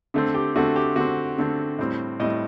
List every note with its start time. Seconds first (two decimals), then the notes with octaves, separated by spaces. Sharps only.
0.14 D3 A3 C4
0.34 G4
0.55 D3 A3 C4 F#4
0.76 G4
0.96 D3 A3 C4 F#4
1.38 D3 A3 C4
1.79 A2 G3 C4
2.20 A2 G3 C4 D#5